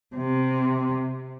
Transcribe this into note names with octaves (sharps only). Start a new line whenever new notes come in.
C3